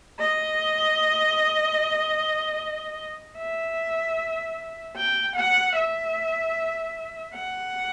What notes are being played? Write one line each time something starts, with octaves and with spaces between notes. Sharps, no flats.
D#5
E5
G5
F#5
E5
F#5